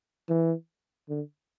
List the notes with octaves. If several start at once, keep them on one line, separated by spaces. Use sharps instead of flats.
E3
D3